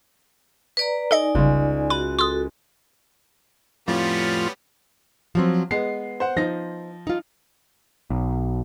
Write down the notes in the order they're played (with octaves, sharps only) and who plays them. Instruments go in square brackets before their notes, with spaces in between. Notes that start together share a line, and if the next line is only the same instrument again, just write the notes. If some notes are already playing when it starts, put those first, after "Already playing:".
[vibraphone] B4 D5 A#5
[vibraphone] D#4 D5 G#5 [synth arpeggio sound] A4 D#5
[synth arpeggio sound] G1 G3 [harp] C#2
[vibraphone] F#4 [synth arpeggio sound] B5 [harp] D#7
[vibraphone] F#4 A4 [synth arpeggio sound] C6 D#6
[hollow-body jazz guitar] F2 A2 [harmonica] G3 B3 C#4 [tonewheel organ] F4
[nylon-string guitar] F3 F#3 C4
[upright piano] G#3 C7 [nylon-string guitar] B3
[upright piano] C5 F#5
[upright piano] F3 A#6 [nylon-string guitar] D#4 C5
[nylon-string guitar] D#4 F4
[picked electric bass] B1